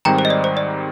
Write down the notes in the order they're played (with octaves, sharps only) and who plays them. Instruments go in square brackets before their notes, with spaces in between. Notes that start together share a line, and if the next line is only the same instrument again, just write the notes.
[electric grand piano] G#2 D#3 G3 C4 D#4 [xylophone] G5 A#5
[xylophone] C5
D#5
D5
C5
D5